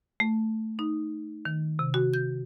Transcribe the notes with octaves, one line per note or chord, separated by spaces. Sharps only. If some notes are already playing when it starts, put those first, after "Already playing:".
A3
D#4
D#3
C3
F#4
G6